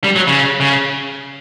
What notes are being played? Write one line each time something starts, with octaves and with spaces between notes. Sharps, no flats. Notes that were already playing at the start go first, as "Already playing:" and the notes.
G3
F#3
C#3
C#3